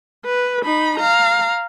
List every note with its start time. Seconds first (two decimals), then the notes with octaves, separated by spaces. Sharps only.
0.25 B4
0.64 D#4 B5
0.98 F5 A#5